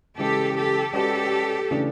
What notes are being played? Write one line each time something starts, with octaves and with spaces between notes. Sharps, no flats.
C#3 E3 G#3 C#4 G4 A4
G4 A4
G#3 C#4 F#4 G4 A4 B4 D5
C#3 E3 A3 D4